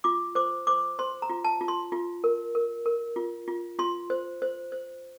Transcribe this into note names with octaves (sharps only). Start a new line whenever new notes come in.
F4 D6
C5 D6
C5 D6
C5 C6
A#5
F4
A5
F4
C6
F4
A#4
A#4
A#4
F4
F4
F4 C6
C5
C5
C5